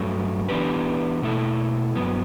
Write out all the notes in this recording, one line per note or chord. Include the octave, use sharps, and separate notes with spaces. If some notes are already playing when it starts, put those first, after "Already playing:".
Already playing: G2 F#3 A3
E3 B3 D4 G4 B4
B2 A3 E4 A4
G2 F#3 B3